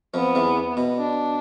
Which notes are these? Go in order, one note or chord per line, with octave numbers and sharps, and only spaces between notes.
F2 F3 B3
E2 E3
B2
D4